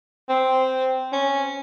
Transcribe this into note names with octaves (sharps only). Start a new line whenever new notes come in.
C4
C#4